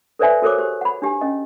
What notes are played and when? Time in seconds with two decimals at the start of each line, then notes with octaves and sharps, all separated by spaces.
0.19 A4 B4 C5 D5 E5 G#5
0.42 F#4 A4 A#4 C5 C#5 D6
0.58 G4 C5
0.81 F#5 B5
1.02 D4 G4 G#5
1.21 C#4 D#5